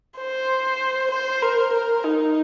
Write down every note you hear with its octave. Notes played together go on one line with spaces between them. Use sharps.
C5
C5
A#4
A#4
D#4